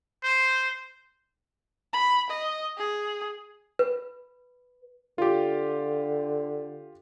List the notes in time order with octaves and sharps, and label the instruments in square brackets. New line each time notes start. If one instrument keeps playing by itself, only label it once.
[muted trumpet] C5
[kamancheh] B5
D#5
G#4
[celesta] B4
[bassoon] D3 [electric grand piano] F4 G4